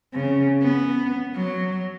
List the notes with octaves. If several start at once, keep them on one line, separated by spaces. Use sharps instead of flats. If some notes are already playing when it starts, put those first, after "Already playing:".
C#3
B3
F#3